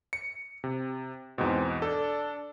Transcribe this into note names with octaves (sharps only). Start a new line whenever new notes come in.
C#7
C3
E2 G#2 B2 C4
D4 A4